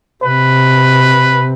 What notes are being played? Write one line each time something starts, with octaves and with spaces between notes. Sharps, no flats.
C3 B4